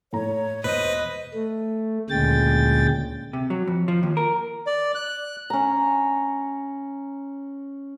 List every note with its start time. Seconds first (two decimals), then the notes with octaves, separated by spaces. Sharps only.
0.13 A2 A3 C#5 A#5
0.64 E1 B4 C5 D#5
1.34 A3
2.10 D2 A#2 C#3 G#3 G5 A6
3.33 C3
3.50 F#3
3.67 F2
3.88 F3
4.03 D#2
4.17 A#4
4.67 D5
4.95 F#6
5.50 C#4 A#5